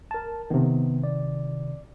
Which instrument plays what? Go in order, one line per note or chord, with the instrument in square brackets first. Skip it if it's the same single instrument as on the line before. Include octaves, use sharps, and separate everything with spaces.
[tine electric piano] A#4 A5
[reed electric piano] C3 D#3 [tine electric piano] B3
[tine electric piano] D5